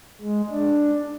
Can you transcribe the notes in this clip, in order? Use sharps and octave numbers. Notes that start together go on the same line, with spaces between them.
G#3
D4